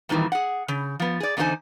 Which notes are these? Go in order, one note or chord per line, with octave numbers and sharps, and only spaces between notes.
F2 A#2 D#3 E3 G3
G#4 F#5
C#3
F3 B3
G#4 D5
E2 D3 D#4 F4 C5 G#5